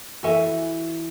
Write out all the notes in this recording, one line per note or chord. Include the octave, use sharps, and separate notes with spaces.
E3 F#4 A4 E5 G#5